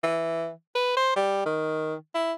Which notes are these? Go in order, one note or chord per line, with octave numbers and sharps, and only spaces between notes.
E3
B4
C5
G3
D#3
E4